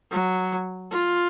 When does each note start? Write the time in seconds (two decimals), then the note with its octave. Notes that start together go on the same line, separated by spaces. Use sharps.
0.12 F#3
0.92 F4